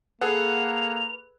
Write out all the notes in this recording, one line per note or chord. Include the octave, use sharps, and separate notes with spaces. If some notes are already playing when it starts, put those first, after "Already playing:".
A#3 G#4 A4 B4 F#5 F7